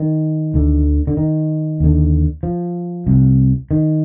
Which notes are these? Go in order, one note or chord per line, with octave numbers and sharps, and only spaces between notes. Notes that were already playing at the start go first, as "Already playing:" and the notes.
Already playing: D#3
D2 D3
D3
D#3
D#2 D3
F3
C2 C3
D#3